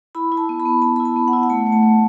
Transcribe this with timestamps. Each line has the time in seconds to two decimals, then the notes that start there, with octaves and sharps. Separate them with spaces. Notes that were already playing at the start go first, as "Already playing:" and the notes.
0.15 E4 B5
0.32 E4
0.37 A5
0.49 B3
0.60 B5
0.66 B3
0.82 B3 A5
0.96 B5
1.00 E4
1.05 A5
1.16 B3
1.28 F#5
1.33 E4
1.43 F#5
1.50 A3 A5
1.67 A3
1.72 A5
1.83 A3